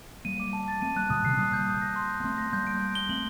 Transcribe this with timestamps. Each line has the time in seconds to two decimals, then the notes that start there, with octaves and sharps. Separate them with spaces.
0.25 G3 A#3 D#7
0.40 D6
0.53 A5
0.68 A6
0.82 A3 C4 D#7
0.96 G3 A#3 F#6
1.10 A#2 D3 D#6
1.24 C3 D#3 C7
1.33 C4
1.38 G3 A#3 D#6
1.53 G6
1.68 D#6
1.81 A#6
1.96 C6
2.09 G6
2.20 A#3
2.24 A3 C4 C6
2.38 A#6
2.52 G3 A#3 G6
2.67 D7
2.81 G6
2.95 G7
3.09 A3 C4 F#7